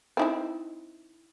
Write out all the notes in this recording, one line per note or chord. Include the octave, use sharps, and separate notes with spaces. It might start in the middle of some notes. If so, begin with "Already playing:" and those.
C4 D#4 E4